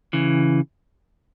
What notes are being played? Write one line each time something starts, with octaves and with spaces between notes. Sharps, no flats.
C#3 E3